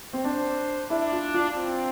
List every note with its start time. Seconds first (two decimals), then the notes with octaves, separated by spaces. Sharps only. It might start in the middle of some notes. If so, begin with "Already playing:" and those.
0.13 C4
0.24 D4 C5
0.90 D4 E4
1.12 F4
1.34 F4
1.57 C4